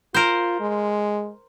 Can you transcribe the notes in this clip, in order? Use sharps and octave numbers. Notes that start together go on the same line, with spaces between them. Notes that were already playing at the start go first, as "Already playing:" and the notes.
F4 A#4 C5
G#3